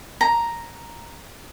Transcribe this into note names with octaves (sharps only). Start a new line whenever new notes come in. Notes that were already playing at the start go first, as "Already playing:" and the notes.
A#5